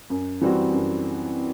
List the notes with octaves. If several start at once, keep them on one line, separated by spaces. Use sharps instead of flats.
F#2
E3 G3 C4 F#4
F#2